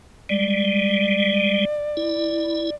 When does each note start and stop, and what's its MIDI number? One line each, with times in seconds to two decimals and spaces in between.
0.29 1.65 55
0.29 1.65 56
0.29 2.75 74
1.97 2.70 64